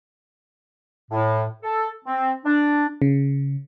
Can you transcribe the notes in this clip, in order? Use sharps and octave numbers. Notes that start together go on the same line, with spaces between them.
A2
A4
C4
D4
C#3